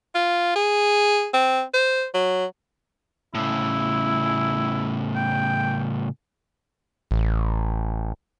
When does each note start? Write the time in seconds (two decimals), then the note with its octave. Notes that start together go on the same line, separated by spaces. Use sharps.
0.15 F4
0.56 G#4
1.33 C4
1.74 C5
2.14 F#3
3.35 A2 C#3 E4
5.16 G5
7.11 A1